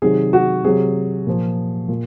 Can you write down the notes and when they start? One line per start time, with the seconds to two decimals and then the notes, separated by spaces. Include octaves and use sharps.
0.02 C3 D#3 F#3 G#4
0.33 F#4
0.64 C3 F#3 G#4
1.27 A#2 F3
1.89 A#2